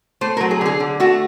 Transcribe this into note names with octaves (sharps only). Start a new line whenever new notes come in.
A3 C5
F#3 A#4
G#4
D3 G#4
D3
A3 F#4